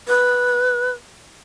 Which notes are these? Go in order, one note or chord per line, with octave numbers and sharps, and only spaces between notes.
B4